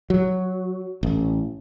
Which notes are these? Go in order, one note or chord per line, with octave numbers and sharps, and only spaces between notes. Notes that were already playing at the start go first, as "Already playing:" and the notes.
F#3
A1